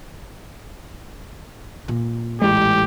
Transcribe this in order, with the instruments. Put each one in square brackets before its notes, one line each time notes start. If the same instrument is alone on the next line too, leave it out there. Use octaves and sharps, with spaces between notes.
[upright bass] A#2
[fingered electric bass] A1 G#3 [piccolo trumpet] G4